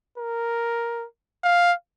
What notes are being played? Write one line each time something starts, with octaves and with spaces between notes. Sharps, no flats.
A#4
F5